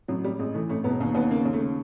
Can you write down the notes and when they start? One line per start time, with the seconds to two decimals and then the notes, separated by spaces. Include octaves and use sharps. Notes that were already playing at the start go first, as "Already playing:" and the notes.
0.08 A1 F#3
0.24 A1 G3
0.39 A1 G#3
0.54 E3 A3
0.69 A1 A3
0.84 E1 B3
1.00 D#2
1.14 D#2 B3
1.30 C#3 A#3
1.45 D#2
1.53 A3
1.60 C#3